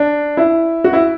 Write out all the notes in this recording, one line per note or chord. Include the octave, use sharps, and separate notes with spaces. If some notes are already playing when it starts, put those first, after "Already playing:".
Already playing: D4
E4
F#4
E4